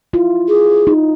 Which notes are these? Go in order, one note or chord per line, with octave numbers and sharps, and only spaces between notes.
E4 F4
G#4
D#4